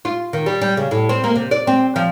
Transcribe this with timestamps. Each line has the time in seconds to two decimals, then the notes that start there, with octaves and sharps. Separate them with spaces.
0.05 F4
0.33 D#3
0.46 G3
0.61 G3
0.77 C#3
0.91 A2
1.09 C4
1.24 A#3
1.35 C3
1.51 D5
1.67 C4
1.96 F3